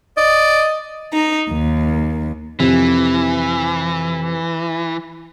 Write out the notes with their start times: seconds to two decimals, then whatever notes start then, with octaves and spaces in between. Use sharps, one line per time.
0.17 D5 D#5
1.14 D#4
1.51 D#2
2.60 F2 C3 E3